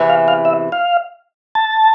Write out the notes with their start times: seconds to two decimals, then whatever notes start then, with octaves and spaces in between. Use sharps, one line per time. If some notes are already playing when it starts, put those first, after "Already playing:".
Already playing: E2 C3 E3
0.09 F5
0.28 F5
0.45 E5
0.72 F5
1.55 A5